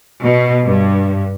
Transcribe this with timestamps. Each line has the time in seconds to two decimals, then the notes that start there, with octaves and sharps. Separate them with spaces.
0.22 B2
0.63 G2